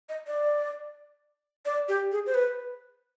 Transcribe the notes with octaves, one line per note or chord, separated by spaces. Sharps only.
D#5
D5
D5
G4
G#4
C5
B4